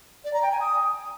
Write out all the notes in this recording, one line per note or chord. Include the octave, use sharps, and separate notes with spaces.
D5
A#5
G5
G#5
D#6